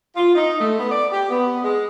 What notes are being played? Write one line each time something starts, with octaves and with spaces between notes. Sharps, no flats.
F4
D#4
A3
B3
D5
G4
B3
G#3